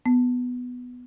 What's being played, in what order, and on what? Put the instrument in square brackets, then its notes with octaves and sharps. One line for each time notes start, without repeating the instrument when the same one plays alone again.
[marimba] B3